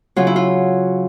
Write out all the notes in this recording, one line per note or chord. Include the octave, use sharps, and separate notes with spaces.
C#3 F#3 F4
E4
F4